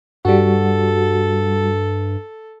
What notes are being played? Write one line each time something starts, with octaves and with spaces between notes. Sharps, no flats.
G2 G3 F#4 A4